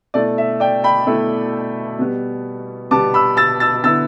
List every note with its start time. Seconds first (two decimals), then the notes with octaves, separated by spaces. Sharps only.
0.14 B2 A3 E4 D5
0.38 E5
0.60 D5 G5
0.84 G5 B5
1.07 B2 A3 E4
1.99 B2 G3 B3
2.91 B2 G3 B3 A5 D6
3.14 B5 E6
3.37 E6 A6
3.60 E6 A6
3.84 D3 B3 E4 E6 A6